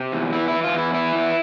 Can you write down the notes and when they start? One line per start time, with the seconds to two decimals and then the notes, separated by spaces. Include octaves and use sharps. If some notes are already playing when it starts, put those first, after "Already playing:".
Already playing: C3
0.12 E2
0.33 E3 E4
0.48 E4
0.54 E3
0.64 F4
0.74 E2 E4
0.94 E3 E4
1.15 E2